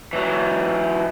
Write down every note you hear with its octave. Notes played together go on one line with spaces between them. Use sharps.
E3 F#3